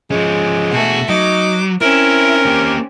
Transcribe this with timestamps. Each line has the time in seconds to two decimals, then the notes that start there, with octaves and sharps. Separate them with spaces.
0.11 F3 G#3 C#4
0.72 B2 A3 F#4 G#4
1.09 F#3 D#4 D6
1.81 C4 C#4 E4 A#4
2.47 A#3 G4